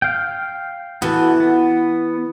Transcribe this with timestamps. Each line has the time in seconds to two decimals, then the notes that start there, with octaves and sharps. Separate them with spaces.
0.02 F5 G5
1.02 E3 B3 F#4 A4
1.40 B3